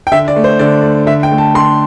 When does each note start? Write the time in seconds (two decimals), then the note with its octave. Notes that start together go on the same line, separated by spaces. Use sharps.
0.07 G5
0.12 D3 E5
0.28 D5
0.36 A3
0.44 C5
0.59 D3 D5
0.83 A3
1.06 D3 E5
1.23 G5
1.31 A3
1.38 A5
1.54 D3 C6